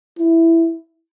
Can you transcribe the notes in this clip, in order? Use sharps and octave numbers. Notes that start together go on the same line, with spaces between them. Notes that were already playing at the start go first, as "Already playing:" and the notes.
E4